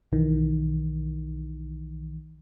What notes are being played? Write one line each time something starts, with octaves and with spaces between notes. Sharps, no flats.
B1 D#3 E3